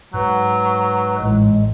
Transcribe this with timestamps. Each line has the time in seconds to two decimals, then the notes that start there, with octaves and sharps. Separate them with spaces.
0.14 G#2 F#3 B4
1.18 A1 A2 G#3